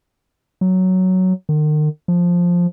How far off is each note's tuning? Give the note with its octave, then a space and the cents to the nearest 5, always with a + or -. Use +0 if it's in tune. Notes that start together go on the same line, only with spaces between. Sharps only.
F#3 +5
D#3 -40
F3 +5